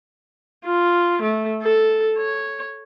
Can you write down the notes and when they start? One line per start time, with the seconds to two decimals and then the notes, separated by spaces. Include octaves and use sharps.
0.65 F4
1.22 A3
1.63 A4
2.18 C#5